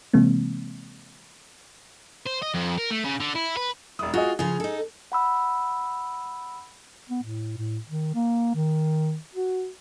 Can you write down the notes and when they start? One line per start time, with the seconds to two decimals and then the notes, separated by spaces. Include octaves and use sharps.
0.14 C3 E3 G#3 A#3 C4
2.27 C5
2.43 D#5
2.55 F2
2.78 A#4
2.91 A3
3.05 C#3
3.20 D3
3.35 E4
3.57 B4
3.99 E1 E4 D#6
4.14 F4 F#4 G#4 D#5
4.39 C#3 F3 F4 G#4
4.60 D#4 A4
5.12 F#5 B5 E6
7.10 B3
7.23 A2
7.58 A2
7.89 D#3
8.14 A#3
8.55 D#3
9.35 F#4